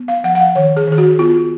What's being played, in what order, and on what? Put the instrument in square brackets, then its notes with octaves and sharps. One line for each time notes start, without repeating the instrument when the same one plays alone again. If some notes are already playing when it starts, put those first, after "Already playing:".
Already playing: [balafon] B3
F5
F3 F#5
F#5
F5
D#3 C#5
G#4
D#3 G#4
F#4
B3 F4